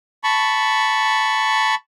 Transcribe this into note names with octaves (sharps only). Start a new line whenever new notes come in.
A5 B5 C#6